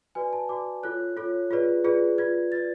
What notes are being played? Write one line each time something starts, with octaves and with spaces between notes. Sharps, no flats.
F#4 B4 D5 G#5
A5
F#4 B4 D5 D6
F4 A4 C#5 F#6
F4 A4 C#5
F4 G#4 B4 D5
F4 G#4 B4 D5
F4 B4 D5 G#6
F4 B4 D5 A6